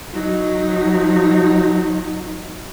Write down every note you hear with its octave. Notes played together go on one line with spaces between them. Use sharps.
F#3 D#4